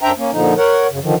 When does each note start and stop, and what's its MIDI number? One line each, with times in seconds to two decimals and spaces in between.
0.01 0.12 42
0.01 0.12 62
0.01 0.12 72
0.01 0.12 76
0.01 0.12 79
0.01 0.12 82
0.18 0.31 58
0.18 0.31 61
0.32 0.54 46
0.32 0.54 50
0.32 0.54 53
0.32 0.54 63
0.57 0.87 70
0.57 0.87 73
0.57 0.87 78
0.90 0.99 42
0.90 0.99 49
1.02 1.15 50
1.02 1.15 51
1.02 1.15 53